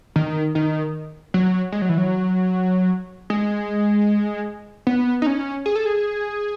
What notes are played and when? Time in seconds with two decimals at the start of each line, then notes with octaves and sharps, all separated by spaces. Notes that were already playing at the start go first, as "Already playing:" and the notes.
0.16 D#3
0.55 D#3
1.34 F#3
1.72 G#3
1.82 F#3
1.89 E3
1.98 F#3
3.30 G#3
4.87 B3
5.22 D#4
5.26 C#4
5.66 G#4
5.76 A4
5.86 G#4